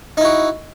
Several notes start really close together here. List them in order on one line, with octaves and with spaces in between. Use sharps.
D#4 E4 F#4